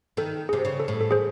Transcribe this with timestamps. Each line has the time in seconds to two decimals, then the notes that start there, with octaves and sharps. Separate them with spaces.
0.17 D#3 A4
0.49 C3 G#4
0.65 C#3
0.80 A4
0.88 A2
1.01 A4
1.11 G#4 C5